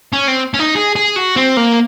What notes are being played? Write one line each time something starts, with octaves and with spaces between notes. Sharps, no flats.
C#4
C4
C#4
D#4
G#4
G#4
F#4
C4
A#3